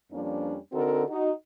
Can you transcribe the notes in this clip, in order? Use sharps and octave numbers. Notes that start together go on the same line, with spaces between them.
F2 F3 G3 A#3 C#4 D4
D3 C4 D#4 F#4 A4 A#4
D#4 F#4